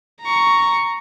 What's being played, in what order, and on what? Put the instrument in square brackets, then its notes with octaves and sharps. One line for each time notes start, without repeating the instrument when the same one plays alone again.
[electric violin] A#5 C#6